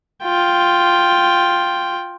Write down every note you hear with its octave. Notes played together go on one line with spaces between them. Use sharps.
F4 G5